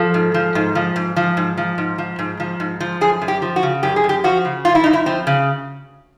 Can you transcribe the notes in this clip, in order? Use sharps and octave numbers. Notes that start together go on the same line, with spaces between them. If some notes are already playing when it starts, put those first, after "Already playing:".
Already playing: F3 A4
G#2
F3
G#2
F3
G#2
F3
G#2
F3
G#2
F3
G#2
F3
G#2
F3
F#2 G#4
F#2
G4
F3
F#4
C#3
F#2 G4
G#4
F#2
G4
F3 F#4
C#3
F#2 F4
E4
F#2 D#4
E4
F3 C4
C#3